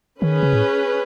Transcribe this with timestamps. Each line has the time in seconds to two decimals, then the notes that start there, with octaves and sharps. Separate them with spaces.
0.22 D#3 C#4 G#4 B4
0.43 C#3
0.53 A2